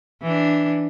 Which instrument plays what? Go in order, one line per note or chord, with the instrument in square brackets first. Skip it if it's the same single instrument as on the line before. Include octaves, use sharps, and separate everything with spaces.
[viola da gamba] E3 D4